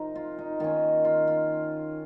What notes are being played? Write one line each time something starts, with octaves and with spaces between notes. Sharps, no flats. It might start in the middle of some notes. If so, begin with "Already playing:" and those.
Already playing: C3 F3 C4 D#4 A#4 D#5
F4
D#4
D#3 A#3 C#4 F4
F4
F4